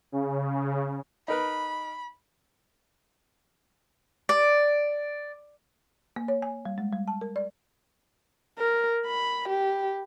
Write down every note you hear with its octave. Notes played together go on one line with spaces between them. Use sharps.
C#3
D#4 A#4 B4 B5
D5
A#3
C#5
G#5
G3
G#3
G3
A5
A#4
D5
A#4
B5
G4